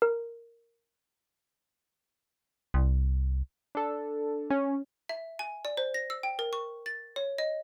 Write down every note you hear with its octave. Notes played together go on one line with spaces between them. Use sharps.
A#4
C2
D4 A4
C#4
E5
G#5
D5
C5
A#6
E6
G5
A#4
C#6
A6
C#5
D#5